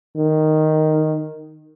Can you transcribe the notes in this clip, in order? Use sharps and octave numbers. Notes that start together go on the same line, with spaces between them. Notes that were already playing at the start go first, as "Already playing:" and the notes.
D#3